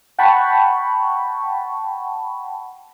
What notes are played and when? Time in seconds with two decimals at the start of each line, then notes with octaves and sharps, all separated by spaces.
0.19 F#5 G5 A5 B5 C#6